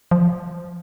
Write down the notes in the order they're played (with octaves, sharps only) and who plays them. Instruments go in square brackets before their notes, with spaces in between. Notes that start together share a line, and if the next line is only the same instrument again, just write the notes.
[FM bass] F3